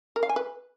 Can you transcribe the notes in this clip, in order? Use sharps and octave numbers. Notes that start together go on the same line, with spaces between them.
A#4
F5
G#5
B4